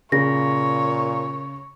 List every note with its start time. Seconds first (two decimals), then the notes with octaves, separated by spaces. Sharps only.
0.12 A#2 C#3 C#5 A#6